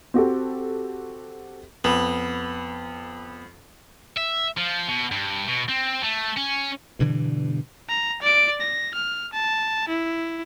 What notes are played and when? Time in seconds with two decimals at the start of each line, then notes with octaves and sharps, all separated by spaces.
0.14 C4 F#4 G4 A4
1.84 F2 B3
4.17 E5
4.57 F3
4.89 B2
5.12 G2
5.48 B2
5.69 C4
6.03 A3
6.37 C#4
6.99 G2 B2 D3 E3
7.89 A#5
8.22 D5 D7
8.61 A#6
8.95 F6
9.33 A5
9.89 E4